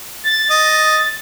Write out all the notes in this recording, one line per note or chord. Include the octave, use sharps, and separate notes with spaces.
A6
D#5